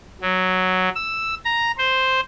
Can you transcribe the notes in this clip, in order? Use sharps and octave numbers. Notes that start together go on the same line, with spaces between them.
F#3
E6
A#5
C5